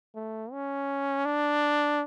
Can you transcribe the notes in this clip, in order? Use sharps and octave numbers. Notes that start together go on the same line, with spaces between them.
A3
C#4
D4